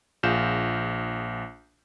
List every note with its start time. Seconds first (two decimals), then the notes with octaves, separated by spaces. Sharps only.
0.23 A#1 F4 G#4 G6 E7